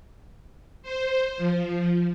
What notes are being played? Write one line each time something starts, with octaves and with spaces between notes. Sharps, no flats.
C5
F3